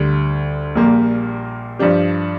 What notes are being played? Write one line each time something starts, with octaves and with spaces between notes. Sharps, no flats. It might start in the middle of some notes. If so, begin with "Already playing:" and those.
Already playing: D2 D3 G3
A#1 A#2 G3 A#3 G4
G2 F3 D4 G4